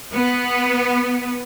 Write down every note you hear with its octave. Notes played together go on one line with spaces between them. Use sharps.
B3